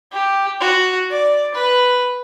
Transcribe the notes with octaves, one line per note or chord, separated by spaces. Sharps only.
G4
F#4
D5
B4